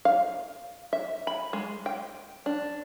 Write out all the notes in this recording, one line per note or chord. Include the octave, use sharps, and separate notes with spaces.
F5
E5
B5
G#3
G5
D4